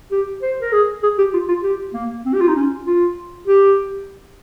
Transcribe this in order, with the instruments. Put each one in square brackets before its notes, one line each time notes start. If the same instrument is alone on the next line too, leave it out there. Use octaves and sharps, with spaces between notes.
[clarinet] G4
C5
A#4
G#4
G#4
G4
F4
F4
G4
A#3
C4
G4
F4
D#4
C#4
F4
G4